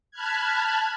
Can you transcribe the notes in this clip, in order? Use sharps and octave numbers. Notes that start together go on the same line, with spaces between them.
A5 B5 F6 F#6 G#6